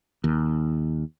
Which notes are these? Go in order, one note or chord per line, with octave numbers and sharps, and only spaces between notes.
D#2